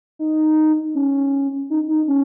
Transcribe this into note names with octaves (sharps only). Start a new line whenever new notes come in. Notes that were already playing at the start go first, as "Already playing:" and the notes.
D#4
C#4
D#4
D#4
C#4